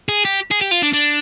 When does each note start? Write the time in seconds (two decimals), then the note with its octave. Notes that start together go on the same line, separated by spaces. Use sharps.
0.09 G#4
0.25 G4
0.51 G#4
0.61 G4
0.71 F4
0.83 D4
0.93 D4